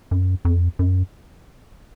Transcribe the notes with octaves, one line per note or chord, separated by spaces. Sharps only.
F#2
F2
F#2